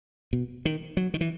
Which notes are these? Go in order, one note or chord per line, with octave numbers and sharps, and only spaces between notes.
B2
D#3
F#3
D#3
E3